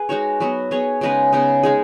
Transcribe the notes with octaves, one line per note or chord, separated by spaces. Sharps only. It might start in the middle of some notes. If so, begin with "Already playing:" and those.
Already playing: G#4 B4
G#3 D#4 F#4 C#5
F#3 B3 F#4
B3 G#4 C#5
C#3 G#3 D#4 B4
C#3 B3 D#4
G#3 D#4 G#4